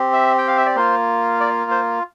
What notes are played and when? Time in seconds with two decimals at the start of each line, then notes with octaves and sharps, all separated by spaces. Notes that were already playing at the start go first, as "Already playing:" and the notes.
Already playing: C4 G4
0.13 E5
0.38 G5
0.48 F5
0.57 E5
0.66 D5
0.76 A#3 F4 C5
1.40 D5
1.71 C5